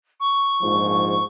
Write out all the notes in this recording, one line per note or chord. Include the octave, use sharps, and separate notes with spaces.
C#6
A#1 G#2 F3